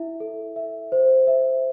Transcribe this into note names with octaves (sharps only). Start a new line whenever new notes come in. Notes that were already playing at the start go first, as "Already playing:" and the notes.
Already playing: E4 E5
A4
E5
C5
E5